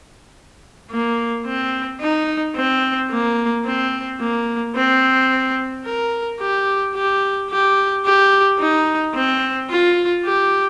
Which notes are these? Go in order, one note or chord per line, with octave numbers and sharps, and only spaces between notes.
A#3
C4
D#4
C4
A#3
C4
A#3
C4
A#4
G4
G4
G4
G4
D#4
C4
F4
G4